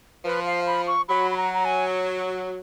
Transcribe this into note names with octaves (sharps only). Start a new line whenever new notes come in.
F3 B4
F5
B5
C#6
F#3 B5
B5
A#5
A#5
G#5